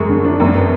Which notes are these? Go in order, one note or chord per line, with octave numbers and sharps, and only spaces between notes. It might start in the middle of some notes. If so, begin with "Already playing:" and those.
Already playing: F#2 G#3 C#6
D3
D4
F#2
B3